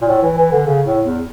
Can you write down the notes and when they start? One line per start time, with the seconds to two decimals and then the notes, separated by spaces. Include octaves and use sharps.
0.01 A#2
0.08 A2
0.23 E3
0.38 E3
0.52 D3
0.67 C#3
0.86 A2
1.05 E2